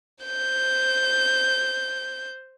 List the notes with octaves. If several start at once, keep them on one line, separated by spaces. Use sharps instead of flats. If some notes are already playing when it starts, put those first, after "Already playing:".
C5 G6